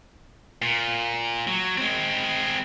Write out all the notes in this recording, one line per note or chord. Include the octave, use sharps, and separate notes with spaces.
A#2
F#3
G#3 C4